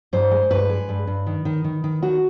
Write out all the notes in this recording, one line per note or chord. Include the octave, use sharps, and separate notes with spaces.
G2 C5
G#3
G2 B4
G#3
G2
G2
D#3
D#3
D#3
D#3
D#3 F#4